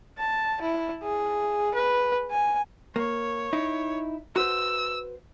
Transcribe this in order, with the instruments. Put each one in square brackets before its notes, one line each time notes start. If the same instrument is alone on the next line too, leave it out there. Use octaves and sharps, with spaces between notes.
[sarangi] A5
E4
G#4
B4
G#5
[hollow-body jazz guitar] A#3 [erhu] C#5
[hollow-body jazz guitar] D#4 E4
[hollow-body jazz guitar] F#4 B4 C5 [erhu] E6